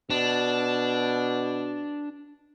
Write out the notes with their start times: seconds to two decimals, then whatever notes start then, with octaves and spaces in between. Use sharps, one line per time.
0.10 B2 D4